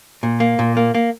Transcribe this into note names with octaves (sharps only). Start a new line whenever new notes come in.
A#2
A#3
A#2
A#3
A#3